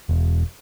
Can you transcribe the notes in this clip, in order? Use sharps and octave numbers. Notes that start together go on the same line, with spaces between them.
E1